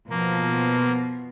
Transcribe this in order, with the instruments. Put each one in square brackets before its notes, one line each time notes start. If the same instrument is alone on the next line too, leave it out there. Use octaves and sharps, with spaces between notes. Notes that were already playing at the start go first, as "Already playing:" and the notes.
[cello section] B2 F3 [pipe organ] A#3